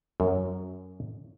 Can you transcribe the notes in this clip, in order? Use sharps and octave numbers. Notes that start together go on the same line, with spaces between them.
F#2